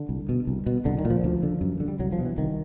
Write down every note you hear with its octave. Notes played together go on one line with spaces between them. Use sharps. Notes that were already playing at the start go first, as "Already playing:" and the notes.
Already playing: D3
C2
B2
C2
B2
C2 D3
D#3
A#2
F3
D2
D3
F#2
D3
G3
C2 F#3
F3
B2
E3
C2 D#3